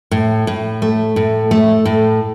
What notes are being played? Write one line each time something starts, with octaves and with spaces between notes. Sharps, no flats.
A2
A2
A3
A2
A3
A2